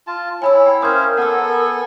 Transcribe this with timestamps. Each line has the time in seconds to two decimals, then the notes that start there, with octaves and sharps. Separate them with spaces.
0.07 F4 A5
0.42 E4 C#5 G#5 B5 E6
0.66 G5
0.82 C#4 A#4 C5 F5 D#6 G#6
1.17 B3 A4 F#5 G#5 E6